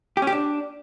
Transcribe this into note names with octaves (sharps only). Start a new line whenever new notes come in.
G4
C#4
G4
D4